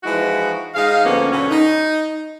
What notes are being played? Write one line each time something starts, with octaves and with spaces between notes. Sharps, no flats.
E3 F3 G#3 D#4 E4 F#4
G#2 D#4 G#4 F5
D2 D3 F3 A#3 B3 C#4
B2 D3 F#3 C#4
D#4